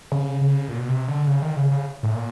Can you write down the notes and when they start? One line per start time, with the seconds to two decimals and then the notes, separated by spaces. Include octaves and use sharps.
0.12 C#3
0.41 C#3
0.68 A#2
0.78 B2
0.89 C3
1.08 D3
1.27 C#3
1.42 D#3
1.57 C#3
1.71 C#3
2.03 A2
2.15 A#2